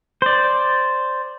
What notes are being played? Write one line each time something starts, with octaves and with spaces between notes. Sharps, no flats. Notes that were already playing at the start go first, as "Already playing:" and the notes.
C5 D5